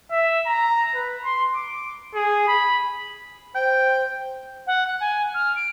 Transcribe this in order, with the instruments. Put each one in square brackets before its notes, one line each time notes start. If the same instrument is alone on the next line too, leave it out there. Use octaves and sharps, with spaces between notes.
[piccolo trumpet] E5
A#5
B4
C6
D6
G#4
B5
[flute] C5 [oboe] G5
[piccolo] F#5
F#6
G#5
F6
D7